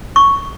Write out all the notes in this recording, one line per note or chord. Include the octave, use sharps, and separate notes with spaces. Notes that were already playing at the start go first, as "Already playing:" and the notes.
C#6